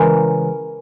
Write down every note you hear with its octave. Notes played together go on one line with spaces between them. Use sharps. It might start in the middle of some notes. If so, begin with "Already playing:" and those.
Already playing: C#3 E3 G#3 A#4